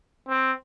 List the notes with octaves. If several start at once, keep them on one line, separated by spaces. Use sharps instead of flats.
C4